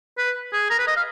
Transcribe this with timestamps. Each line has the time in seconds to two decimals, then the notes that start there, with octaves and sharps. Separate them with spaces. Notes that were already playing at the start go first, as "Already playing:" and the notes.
0.18 B4
0.53 G#4
0.70 A#4
0.79 B4
0.87 D#5
0.97 F5